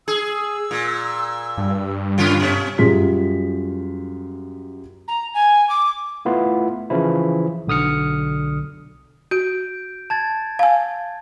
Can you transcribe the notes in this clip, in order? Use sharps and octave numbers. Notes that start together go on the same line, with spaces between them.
G#4 E6
A#2
G2
C#3 C#4 F4
B2 C#4
F#2 G3 F4 G#4 B6
A#5
G#5
D6
A3 B3 E4 F4
C#3 E3 F3 E4
B1 D3 D#6 F6 C#7
F#4 G6 D7
A5 G#6 A6
F5 G#5